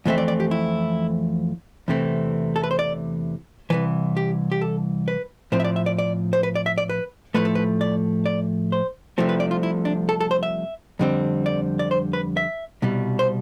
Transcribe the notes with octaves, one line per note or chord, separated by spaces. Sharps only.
F2 E3 A3 C4 E5
D5
D5
G4
E4
E2 C3 E3 A3 C4
A4
B4
C5
D5
C2 C3 E3 B4
G4
G4
A4
B4
A2 F3 C4 C5
E5
D5
E5
D5
D5
C5
B4
D5
E5
D5
B4
A2 F3 A3 B4
A4
B4
D5
D5
C5
C2 C3 F3 A3 C4
B4
D5
F4
E4
D4
A4
A4
C5
E5
F2 D3 G3 C4
D5
D5
C5
B4
E5
C2 B2 G3
C5